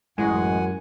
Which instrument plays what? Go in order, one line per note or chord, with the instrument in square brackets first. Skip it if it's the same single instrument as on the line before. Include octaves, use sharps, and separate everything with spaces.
[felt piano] A1 E3 C#6 [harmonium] F#2 [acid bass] G#3 [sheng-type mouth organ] F#5 G#5